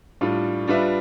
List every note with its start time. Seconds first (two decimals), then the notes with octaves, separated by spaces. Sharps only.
0.21 A2 G3 D4 F4
0.67 G3 D4 F4 B4 E5